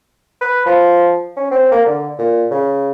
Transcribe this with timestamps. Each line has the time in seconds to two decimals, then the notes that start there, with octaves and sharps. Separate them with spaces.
0.41 B4
0.66 F3
1.37 C#4
1.51 C4
1.71 A#3
1.86 D3
2.19 A#2
2.51 C#3